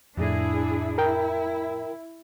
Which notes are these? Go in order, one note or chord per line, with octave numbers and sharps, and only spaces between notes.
F2 A2 D4 E4 G#4
E4 A#4 G5